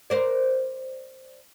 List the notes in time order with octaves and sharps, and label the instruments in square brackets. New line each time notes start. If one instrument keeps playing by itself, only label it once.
[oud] A#4 C5 D5